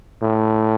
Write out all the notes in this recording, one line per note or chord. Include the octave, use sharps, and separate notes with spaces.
A2